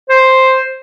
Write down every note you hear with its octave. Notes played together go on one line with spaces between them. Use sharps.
C5